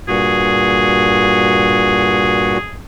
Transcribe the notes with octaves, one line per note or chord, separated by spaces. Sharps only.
G2 A#2 F#4 G#4